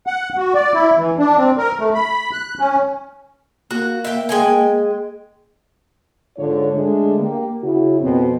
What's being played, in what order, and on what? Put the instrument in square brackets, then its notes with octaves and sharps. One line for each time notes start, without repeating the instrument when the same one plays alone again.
[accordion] F#5
F#4
D5
E4
E3
D4
C4
A#4
A3
B5
F#6
C#4
[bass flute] A#3 [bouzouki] F#4
[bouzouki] E5 G5
G#3 G5 G#5
[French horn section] G#2 D3 F4 C#5
D3 G#3 A3 D4
A#3 G4
C#3 E4 F#4
F2 B2 C4